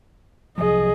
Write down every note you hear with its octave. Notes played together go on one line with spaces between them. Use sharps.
C2 F3 F#3 G#4 D#5